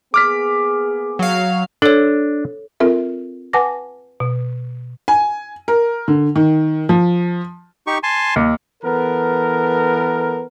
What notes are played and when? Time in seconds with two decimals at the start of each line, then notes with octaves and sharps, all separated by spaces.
0.14 A#3 B3 G#4 D6 F6 B6
1.19 F#3 F5
1.82 D4 A4 C#5
2.80 C4 F4 A4 A#4 E5
3.53 B4 F#5 G#5 A5 D6 A#6
4.20 B2
5.08 G#5
5.68 A#4
6.08 D3
6.36 D#3
6.89 F3
7.87 D#4 G4 C#6
8.03 G#5 A5 C6
8.36 D#2
8.84 E3 B3 A4 A#4